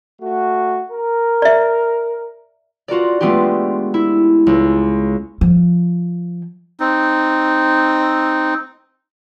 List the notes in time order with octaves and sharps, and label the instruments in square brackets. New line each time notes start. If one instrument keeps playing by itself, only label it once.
[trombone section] A3 F#4
A#4
[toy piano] D5 E5
[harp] F4 F#4 A#4 D5
G#3 A3 B3 D4 F4 G4
E4
C#2
[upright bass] F3
[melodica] C4 D#4